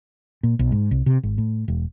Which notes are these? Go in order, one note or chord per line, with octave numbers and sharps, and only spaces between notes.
A#2
B1
G#2
C2
C3
G#1
A2
E1